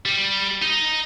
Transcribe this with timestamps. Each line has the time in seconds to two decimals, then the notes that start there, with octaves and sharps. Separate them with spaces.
0.06 G3
0.62 D#4